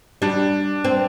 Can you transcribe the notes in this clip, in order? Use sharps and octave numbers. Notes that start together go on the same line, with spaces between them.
G3 D4
C4